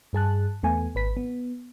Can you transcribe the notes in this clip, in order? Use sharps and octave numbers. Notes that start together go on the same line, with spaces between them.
G2 G#4 A5 F#6
E2 A3 B3 G#5
G#1 B4 B6
B3